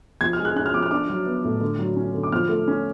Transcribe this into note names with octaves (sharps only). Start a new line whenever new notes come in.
F3 G#6
F6
G#3
F#6
C#4 F#6
F6
F3 D6
F6
D4 D6
F#3
B3
A2
D3
F#3
C#4
D3
D6
F3 F6
A3
C#4